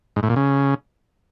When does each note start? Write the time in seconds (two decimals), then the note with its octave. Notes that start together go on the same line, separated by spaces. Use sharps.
0.16 G#2
0.23 A2
0.30 A#2
0.36 C#3